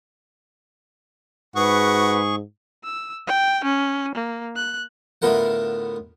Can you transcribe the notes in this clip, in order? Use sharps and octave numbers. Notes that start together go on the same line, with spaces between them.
G#2 F#4 G#4 B4 C#6
E6
G5
C#4
A#3
F#6
A2 D3 B3 F4 A#4 F#5